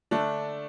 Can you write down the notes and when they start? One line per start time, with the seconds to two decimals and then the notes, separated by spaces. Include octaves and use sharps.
0.11 D3 A3 D4